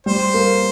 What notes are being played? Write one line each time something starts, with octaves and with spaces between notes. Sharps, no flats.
G3 C5
A#3